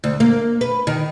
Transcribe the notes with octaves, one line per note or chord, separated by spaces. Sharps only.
D2
A#3
B4
D#3